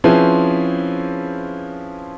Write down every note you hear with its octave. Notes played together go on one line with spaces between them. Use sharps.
F3 C4 C#4 E4 G#4 B4